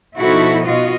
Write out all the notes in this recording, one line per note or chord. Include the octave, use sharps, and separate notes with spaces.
B2 F3 D#4 E4 F#4 A4
B2 F4 F#4 D#5